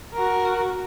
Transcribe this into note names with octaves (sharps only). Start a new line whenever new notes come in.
F#4 A#4